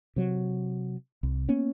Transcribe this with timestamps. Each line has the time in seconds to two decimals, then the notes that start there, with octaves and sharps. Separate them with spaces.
0.16 C3 F#3
1.23 C2
1.48 A#3 B3 C#4